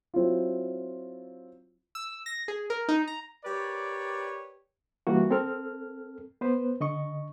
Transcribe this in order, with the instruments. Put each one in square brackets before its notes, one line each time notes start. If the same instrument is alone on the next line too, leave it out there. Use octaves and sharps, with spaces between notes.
[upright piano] F#3 C4 E4 F4
[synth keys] E6
A#6
G#4
A#4
D#4
A#5
[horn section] G4 A#4 B4 C#5 D5
[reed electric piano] E3 G3 A#3 F#4
C4 A4 A#4 F6
B3 B4 C5
D3 D#5 C#6